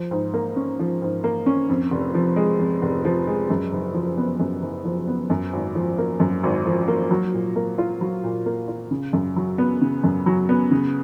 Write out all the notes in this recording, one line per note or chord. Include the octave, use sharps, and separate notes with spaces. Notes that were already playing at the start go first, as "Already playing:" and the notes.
Already playing: F3
G#2
A#3
C#4
F3
G#2
A#3
C#4
F2
F1
F3
G#3
F2
F1
F3
G#3
F#2
F#1
F3
B3
F#2
F#1
F3
B3
F#2
G#1
F3
A#3
F#2
G#1
F3
A#3
F#3
A#2
A#3
F4
F#3
A#2
A#3
F4
C#3
F#2
F#3
B3
C#3
F#2
F#3
B3
C#3